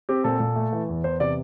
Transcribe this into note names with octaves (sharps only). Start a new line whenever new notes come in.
C4 G4
A#2 A4
A#2
A3
E3
E2
E2 C5
C3 D5